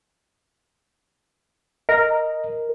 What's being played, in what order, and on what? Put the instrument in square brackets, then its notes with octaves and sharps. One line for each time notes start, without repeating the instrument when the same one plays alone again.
[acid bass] A#4 [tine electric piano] D#5